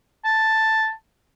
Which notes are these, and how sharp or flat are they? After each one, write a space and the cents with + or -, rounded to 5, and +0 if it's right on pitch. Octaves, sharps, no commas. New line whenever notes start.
A5 +5